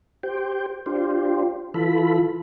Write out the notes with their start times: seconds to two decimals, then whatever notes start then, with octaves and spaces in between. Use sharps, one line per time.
0.23 G4 C5 G5
0.86 D4 F4 G4 C5
1.74 E3 F4 A4 B5